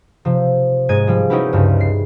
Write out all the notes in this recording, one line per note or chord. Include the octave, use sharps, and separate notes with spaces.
C3 F3
G#2 G#3 G#6 D#7
F3 G3
C#4 D#4 E4 F#4 G4 B4
C#2 G2
C7